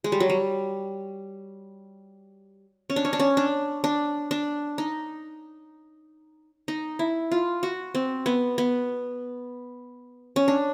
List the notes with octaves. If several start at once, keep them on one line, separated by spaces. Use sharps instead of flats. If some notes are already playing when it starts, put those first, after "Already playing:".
G#3
G3
F#3
G3
C#4
D4
C#4
D4
C#4
D4
D4
D4
D#4
D#4
E4
F4
F#4
C4
B3
B3
C#4
D4